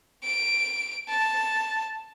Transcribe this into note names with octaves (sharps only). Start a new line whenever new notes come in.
D7
A5